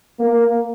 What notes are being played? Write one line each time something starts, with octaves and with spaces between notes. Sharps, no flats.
A#3